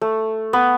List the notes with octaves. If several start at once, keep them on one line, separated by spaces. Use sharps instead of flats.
A3
B3